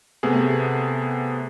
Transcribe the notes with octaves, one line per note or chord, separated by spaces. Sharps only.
C3 A3 B3 G#4